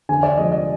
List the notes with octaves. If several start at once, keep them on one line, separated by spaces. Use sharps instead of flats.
D3 G#5
D5
F3 G#3 D#5
D#5